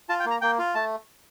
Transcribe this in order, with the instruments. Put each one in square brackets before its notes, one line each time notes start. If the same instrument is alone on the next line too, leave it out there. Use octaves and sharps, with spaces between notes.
[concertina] F4 A5
G5
A#3
A#5
A#3 G5
F4
A3 A5